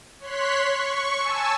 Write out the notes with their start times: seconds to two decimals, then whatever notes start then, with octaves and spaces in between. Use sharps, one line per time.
0.20 C#5 C6 F#6 B6
0.65 C#6
1.20 G#5 A5 E6